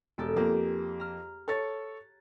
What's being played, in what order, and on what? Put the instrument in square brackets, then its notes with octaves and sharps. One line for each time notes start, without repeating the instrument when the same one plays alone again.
[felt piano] E1 [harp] G4 A4 D7
[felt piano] F2 A#3 [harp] G4 G#4
[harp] A#5 F6
[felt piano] A4 C#5 A6